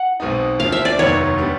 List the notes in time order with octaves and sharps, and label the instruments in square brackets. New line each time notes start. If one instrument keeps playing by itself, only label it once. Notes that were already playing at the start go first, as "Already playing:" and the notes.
Already playing: [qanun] F#5
[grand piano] B1 B2 G#3 C4 D#4
[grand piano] D2 D3 F3 [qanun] F5
[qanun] E5
D5
[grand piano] F1 D#2 D#3 F#3 B3 [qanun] C#5
[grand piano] D3 G3 B3